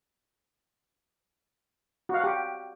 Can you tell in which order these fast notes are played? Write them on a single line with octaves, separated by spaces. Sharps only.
F#4 F5 F#5 G4